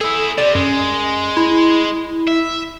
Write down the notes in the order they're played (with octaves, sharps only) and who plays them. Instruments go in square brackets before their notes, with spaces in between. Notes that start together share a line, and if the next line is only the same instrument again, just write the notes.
[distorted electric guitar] E4 G#4 [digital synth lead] A4
[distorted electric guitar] C3 [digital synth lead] D5
[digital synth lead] F#2 [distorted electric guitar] G#3
[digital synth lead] E4
[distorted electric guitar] E5